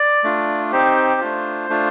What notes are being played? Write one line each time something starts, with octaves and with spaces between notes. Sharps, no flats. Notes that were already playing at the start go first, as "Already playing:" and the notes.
Already playing: D5
A3 D4 F4
C4 D#4 G4 C5
A3 D4 F4
A3 D4 F4